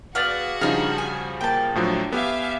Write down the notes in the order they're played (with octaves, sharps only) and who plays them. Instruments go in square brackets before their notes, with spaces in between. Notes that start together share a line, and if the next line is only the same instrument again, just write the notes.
[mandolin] B3 D5 F5 [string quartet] F#4 G#4 [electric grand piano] F#5 A6
[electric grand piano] C#3 F3 G3 [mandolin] D4 D#4 F5
[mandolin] G#5
[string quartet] A#3 [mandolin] G5 A5
[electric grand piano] A2 F3 F#3 [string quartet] D3
[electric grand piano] B3 G4 [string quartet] E5 F5 G#5